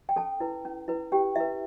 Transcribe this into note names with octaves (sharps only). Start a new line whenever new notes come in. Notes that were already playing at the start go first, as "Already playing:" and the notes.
G5
C#4 A4 A5
E4 B4
C#4
E4 B4
C#4 G4 G5
E4 B4 E5